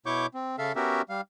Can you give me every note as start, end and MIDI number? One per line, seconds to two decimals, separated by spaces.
0.06 0.26 47
0.06 0.26 64
0.06 0.26 73
0.06 0.26 85
0.06 0.26 86
0.06 0.26 91
0.34 0.56 60
0.58 0.72 49
0.58 0.72 69
0.58 0.72 76
0.58 0.72 77
0.76 1.02 59
0.76 1.02 61
0.76 1.02 66
0.76 1.02 67
0.76 1.02 70
0.76 1.02 76
1.09 1.21 55
1.09 1.21 77